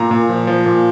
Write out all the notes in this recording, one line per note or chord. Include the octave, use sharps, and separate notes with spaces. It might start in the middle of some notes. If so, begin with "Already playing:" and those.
Already playing: A#2 A#5
A#2
F3
F3
A#2